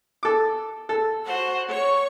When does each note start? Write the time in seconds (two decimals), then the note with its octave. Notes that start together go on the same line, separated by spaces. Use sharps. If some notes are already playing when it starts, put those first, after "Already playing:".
0.23 A4 D6
0.89 A4
1.24 F#4 C5 F#5
1.67 C#5 C#6